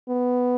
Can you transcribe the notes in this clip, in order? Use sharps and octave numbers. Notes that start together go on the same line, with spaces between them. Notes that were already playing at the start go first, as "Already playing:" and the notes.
B3